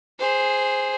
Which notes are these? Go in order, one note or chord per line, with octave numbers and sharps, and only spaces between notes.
G#4 C5